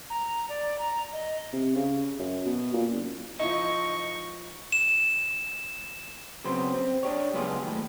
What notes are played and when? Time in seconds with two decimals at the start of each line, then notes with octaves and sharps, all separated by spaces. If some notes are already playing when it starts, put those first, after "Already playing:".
0.10 A#5
0.49 D5
0.79 A#5
1.13 D#5
1.53 C3
1.76 C#3
2.19 F#2
2.45 B2
2.74 A#2
2.91 F#1
3.40 F3 D#4 E4 A5 C#6
4.72 E7
6.44 C#3 F#3 B3 C4 C5
6.74 C4
7.03 D4 G4 C#5
7.34 C#2 F#3 B3 F4 G4 G#4
7.63 D#2 A2